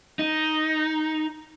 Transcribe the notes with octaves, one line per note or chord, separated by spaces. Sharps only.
D#4